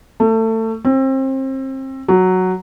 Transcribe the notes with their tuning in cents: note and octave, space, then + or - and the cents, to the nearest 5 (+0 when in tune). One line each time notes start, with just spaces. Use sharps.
A3 +25
C4 +30
F#3 +0